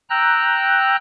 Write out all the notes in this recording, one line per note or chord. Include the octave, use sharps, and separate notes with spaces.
G5 A#5 E6 F#6